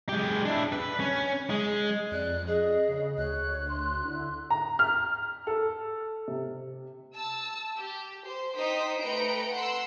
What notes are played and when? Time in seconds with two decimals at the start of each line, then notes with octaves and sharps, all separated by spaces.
0.09 G#3 G4
0.45 D4 E4
0.72 B4
1.00 C#4
1.50 G#3
2.11 F2 D5 F#6
2.47 G#4 D#5
2.89 C#3
3.17 D2 C#5 F#6
3.69 C6
4.05 D3 E4
4.50 A#5
4.79 F6
5.47 A4
6.28 C3
7.15 A5 E6
7.78 G4
8.26 C5 C6
8.56 D#4 C5 G5 D#6 B6
8.99 A3 B4 G5 A#5 C#7 D7
9.53 F#5 C6 E6